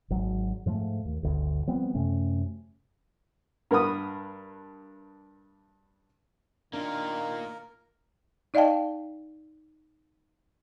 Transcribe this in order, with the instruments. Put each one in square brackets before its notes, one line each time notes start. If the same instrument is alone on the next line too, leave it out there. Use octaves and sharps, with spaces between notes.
[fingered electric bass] G#1 F#3
G#2 F3 G3 A3
D#2
G1 D2
F3 G3 B3 C4
F#2 C3 A3 C#4
[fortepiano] G2 A#4 F#5 B5 D#6
[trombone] D#3 [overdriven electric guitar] A#3 F4 [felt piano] D4 [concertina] A#4
[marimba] D#4 D5 D#5 F5 G5 A5